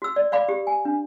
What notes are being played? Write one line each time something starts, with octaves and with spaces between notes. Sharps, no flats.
F#4 E6
D5
D5 F5 B5 D6
G4
G#5
D4